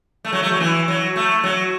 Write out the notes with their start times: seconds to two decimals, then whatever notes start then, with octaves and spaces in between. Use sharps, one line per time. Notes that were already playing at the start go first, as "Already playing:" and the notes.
0.25 A3
0.32 F#3
0.43 A3
0.52 F#3
0.60 E3
0.88 F#3
1.16 A3
1.44 F#3